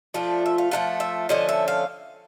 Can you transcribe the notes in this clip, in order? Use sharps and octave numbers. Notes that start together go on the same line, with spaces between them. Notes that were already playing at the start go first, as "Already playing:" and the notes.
F3 A3 D4 F4
E5
F5
F3 A3 D4 F4 F#5
E5
D3 F3 A3 C#4 D#5
E5
F5